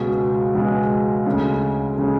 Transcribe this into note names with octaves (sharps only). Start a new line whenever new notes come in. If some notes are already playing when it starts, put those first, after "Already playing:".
Already playing: C#2 B2 G#3
C#2 B2 G#3
D2 C#3 G#3
C#3 G#3